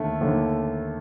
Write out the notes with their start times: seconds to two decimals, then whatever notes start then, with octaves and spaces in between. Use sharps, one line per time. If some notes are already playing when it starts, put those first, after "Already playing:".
Already playing: D#2 D3 A3
0.21 D#2 D3